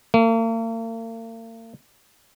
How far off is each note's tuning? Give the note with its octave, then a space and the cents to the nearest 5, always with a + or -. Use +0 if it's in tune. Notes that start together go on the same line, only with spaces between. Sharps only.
A#3 -45